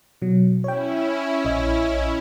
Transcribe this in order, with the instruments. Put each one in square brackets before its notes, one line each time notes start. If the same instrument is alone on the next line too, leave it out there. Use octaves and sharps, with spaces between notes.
[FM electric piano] B2 F#3
[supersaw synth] C#4 E4 [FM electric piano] C#5 G5
[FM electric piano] A#1 C#5 D#5